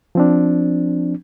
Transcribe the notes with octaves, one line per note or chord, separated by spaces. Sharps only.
F3 C4 D4